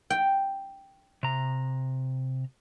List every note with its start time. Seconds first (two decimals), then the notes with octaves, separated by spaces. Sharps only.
0.10 G5
1.23 C3 A#5